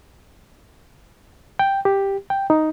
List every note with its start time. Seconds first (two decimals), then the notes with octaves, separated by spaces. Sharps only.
1.59 G5
1.85 G4
2.30 G5
2.50 D#4